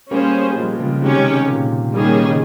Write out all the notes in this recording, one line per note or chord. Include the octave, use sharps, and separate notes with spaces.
G3 A#3 C#4 G#4 C5
G3
F3 G#3
G3
C#3 F3
C#3
C3 D#3 G#3 C#4 G4 C#5
A#2
D#3 G3 A#3 C#4 G#4
C#3